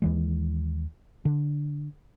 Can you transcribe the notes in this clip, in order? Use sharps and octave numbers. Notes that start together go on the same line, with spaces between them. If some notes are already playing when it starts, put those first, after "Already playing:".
D#2 E3 G#3
D3